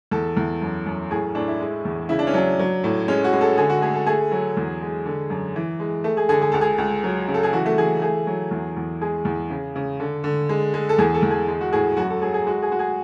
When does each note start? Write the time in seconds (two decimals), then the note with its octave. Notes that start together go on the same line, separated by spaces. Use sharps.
0.11 E2 A4
0.37 E2
0.62 F#2
0.86 F#2
1.10 A2 G#4
1.35 A2 D4
1.48 E4
1.61 G#3
1.85 E2
2.09 C#3 E4
2.19 D4
2.27 C#4
2.34 F#3 D4
2.59 F#3
2.84 A2
3.08 G#3 C#4
3.24 F#4
3.33 G#3
3.41 A4
3.58 D3 G#4
3.70 F#4
3.82 A3 G#4
3.94 A4
4.06 A3 G#4
4.32 F#3
4.57 E2
4.81 G#3
5.06 D3
5.30 F#2
5.56 E3
5.80 G#3
6.04 A3
6.17 G#4
6.29 D3 G#4
6.42 G#4
6.52 C#2 A4
6.61 G#4
6.78 C#2
7.04 F#3
7.28 C#3
7.34 A4
7.43 G#4
7.53 E3 F#4
7.66 A3
7.78 E3 G#4
8.02 A3 G#4
8.27 F#3
8.51 E2
8.77 E2
9.02 G#3 G#4
9.25 E2
9.50 C#3
9.76 C#3
10.00 D3
10.24 D3
10.49 G#3
10.74 G#3
10.89 A4
10.98 E2 G#4
11.14 A4
11.23 E2
11.31 G#4
11.48 G#3
11.61 F#4
11.73 A2 G#4
11.97 F#2 F#4
12.10 A4
12.22 F#3 G#4
12.34 G#4
12.47 G#3 F#4
12.62 G#4
12.72 G#3 F#4
12.79 G#4